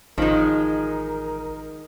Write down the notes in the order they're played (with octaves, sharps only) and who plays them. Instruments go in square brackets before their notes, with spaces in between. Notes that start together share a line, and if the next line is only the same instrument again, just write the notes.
[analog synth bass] A1 [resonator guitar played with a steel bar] D#3 G#3 [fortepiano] F3 D#4 [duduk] A#4